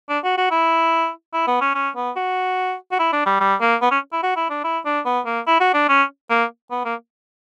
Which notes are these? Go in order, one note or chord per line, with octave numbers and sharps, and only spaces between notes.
D4
F#4
F#4
E4
E4
B3
C#4
C#4
B3
F#4
F#4
E4
D4
G3
G3
A#3
B3
C#4
E4
F#4
E4
D4
E4
D4
B3
A#3
E4
F#4
D4
C#4
A#3
B3
A#3